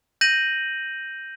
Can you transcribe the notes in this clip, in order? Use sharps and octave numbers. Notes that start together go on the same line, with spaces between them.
G6 A#6 D#7 F#7